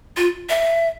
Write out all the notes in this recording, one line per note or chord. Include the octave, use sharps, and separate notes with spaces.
F4
E5